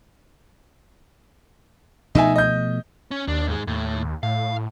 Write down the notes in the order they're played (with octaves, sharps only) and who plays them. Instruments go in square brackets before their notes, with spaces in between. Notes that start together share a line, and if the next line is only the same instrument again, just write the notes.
[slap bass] B2 F3 A3 [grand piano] D#4 E5 G#5
[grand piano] D#5 G6
[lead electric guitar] C#4
[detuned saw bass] D#2 [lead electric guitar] D4
[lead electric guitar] G#2 G#3
[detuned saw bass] D#2 [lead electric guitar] A2
[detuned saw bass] A2 [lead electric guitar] F5